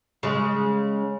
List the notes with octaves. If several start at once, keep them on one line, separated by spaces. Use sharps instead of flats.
C#3 G#3